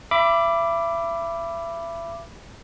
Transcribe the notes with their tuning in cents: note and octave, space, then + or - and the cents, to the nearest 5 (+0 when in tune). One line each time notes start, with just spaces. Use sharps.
E5 +30 B5 +0 D6 +0